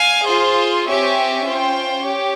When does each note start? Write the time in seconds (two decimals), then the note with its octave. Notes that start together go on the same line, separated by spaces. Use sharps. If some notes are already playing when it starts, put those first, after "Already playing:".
Already playing: F5 G#5
0.27 F4 G#4 C5
0.86 C4 G4 C#5 E5 G#5
1.45 C#4 F4 C5 G5
2.04 G4 C#5